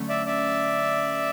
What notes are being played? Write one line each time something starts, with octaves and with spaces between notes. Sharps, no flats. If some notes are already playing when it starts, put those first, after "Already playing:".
Already playing: D3 F#3 A3 C#4
D5 E5
D5 E5